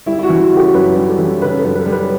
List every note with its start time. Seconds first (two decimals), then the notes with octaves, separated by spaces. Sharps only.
0.06 G3 E4
0.19 E4
0.23 F#4
0.29 E3
0.40 F#4
0.51 C#3
0.57 G4
0.74 F#2 B4
0.96 G3
1.08 A4
1.18 E3
1.42 C#3 B4
1.58 A4
1.64 F#2
1.75 B4
1.86 G3
1.92 B4